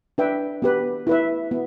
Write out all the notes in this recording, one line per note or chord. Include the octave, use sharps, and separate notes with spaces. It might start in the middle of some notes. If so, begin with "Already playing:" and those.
D4 B4 E5 G5
B3 G4 B4
E4 B4 E5
B3